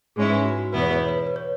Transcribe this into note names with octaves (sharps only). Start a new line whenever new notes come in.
G#2 G#3 C#4 E4 G#4
B4 E5
F#4
F#4
E2 B2 B3 E4 B4
C#5
B4
C#5
B4
C#5
B4
C#5